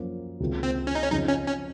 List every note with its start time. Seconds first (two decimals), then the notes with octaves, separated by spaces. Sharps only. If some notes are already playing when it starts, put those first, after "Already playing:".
Already playing: F#2 F3 A#3 C#4
0.40 C#2 C3 D#3 A#3 F4
0.63 C4
0.87 C#4
0.95 D#4
1.03 C#4
1.11 F2 C#3 F3 D#4
1.28 C#4
1.47 C#4